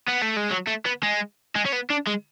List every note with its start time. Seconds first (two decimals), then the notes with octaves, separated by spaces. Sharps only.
0.08 B3
0.22 A3
0.37 G#3
0.51 F#3
0.67 A3
0.86 B3
1.03 G#3
1.56 G#3
1.66 C#4
1.73 B3
1.90 D4
2.07 G#3